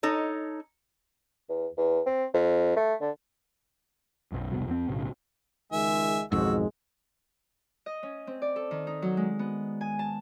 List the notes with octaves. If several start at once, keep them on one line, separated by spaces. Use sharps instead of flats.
D#4 A4 C#5
E2
E2
C4
F2
A3
D3
B1 F#2
F1 C2 B2
F2 C4
B1 A2 C#3
C#2 D#3 G#3 E5 G#5
B1 F2 G#2 D#3 F#3 G#3 F#4 E6
D#5
C#4
C4
D5
A4
D#3
D#4
F#3
G#3
B3
G#5
A5